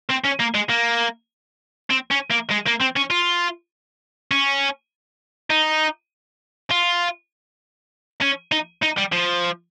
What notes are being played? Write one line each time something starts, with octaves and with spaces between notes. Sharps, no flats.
C4
C#4
A#3
G#3
A#3
C4
C#4
A#3
G#3
A#3
C4
C#4
F4
C#4
D#4
F4
C#4
D#4
D#4
G3
F3